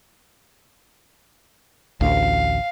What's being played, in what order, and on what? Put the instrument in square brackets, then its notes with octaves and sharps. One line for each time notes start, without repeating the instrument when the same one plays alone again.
[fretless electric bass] A1 D2 [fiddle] F5